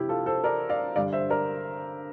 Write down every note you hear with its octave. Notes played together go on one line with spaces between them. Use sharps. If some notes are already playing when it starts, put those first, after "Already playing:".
Already playing: C3 E4 G4
F4 A4
A4 C5
A#4 D5
D5 F5
G2 D3 G3 D5 F5
C5 E5
A#4 D5